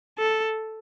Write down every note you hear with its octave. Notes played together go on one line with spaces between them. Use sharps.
A4